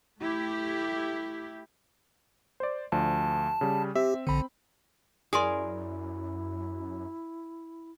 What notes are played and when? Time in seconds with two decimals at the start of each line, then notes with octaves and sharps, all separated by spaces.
0.21 A3 E4 G4
2.60 C5 D5
2.92 D2 F3 D4 A5
3.61 C#3 G3
3.96 C4 G4 E5
4.27 A#1 D3 C4 B5
5.33 F#2 E4 G#4 A#4 D5 C6 D#6